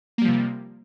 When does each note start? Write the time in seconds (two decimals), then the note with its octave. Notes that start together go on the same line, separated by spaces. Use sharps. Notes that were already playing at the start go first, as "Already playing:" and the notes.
0.18 A#3
0.21 G3
0.25 F3
0.28 C3